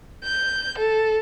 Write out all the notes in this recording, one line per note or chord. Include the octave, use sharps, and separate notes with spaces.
G6
A4